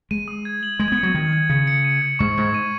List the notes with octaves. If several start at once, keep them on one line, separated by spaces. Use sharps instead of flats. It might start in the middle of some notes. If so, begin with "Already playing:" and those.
G#3 D#7
D#6
G#6
F#7
G#3 G#6
B3
C#7
F#3
D#3 G#6
G#6
C#3 C#7
C#7
D#7
G#6
G#2 C#6
G#2 G#6
D#7